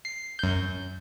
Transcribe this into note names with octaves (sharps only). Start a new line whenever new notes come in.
C7
F#2 G6